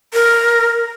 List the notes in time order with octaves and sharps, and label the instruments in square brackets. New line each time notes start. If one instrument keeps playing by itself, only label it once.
[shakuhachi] A#4